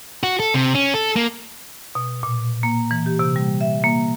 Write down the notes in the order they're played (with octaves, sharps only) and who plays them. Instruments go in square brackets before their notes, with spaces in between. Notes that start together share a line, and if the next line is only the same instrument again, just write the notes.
[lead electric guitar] F#4
A4
C3
C#4
A4
A#3
[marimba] B2
A#2
A#3
E3
G4
C3
G3
E5
A#3